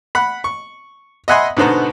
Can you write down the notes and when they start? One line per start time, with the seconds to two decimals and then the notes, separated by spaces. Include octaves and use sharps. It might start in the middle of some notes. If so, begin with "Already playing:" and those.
0.15 F#5 B5
0.44 C#6
1.28 D#5 E5 F#5 G#5 B5 C6
1.57 G#2 B2 D3 B3 C5 A#5